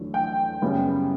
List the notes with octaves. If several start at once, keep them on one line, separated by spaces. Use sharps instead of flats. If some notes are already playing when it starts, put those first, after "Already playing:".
Already playing: E2 D3 F#3 A3
G5
F#2 C#3 G3 B3